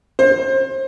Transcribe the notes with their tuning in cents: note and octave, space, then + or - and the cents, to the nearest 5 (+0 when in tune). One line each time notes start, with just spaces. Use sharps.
C5 +30